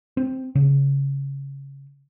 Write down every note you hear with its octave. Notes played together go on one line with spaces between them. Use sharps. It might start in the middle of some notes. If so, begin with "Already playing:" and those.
C4
C#3